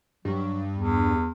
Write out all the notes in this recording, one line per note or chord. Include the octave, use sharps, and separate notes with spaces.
G2 F#3
E2